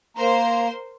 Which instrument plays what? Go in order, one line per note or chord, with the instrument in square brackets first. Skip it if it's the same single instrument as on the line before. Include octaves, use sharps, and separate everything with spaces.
[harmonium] A#3 A#5 [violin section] A#4 C5 C6